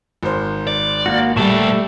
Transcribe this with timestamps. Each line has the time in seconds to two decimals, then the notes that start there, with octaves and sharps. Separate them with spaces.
0.23 G#1 A#4 C5
0.67 D5
1.06 A#3 F#4
1.37 A#2 G3 A3 G4 A5 C#6